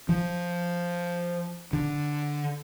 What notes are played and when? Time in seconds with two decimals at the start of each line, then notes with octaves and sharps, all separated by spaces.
0.09 F3
1.73 D3